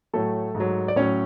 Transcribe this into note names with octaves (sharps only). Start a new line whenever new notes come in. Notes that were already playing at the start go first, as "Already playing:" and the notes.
A2 F#3 A3 A4
G#2
F#3
D5
A2 F#3 C#4 C#5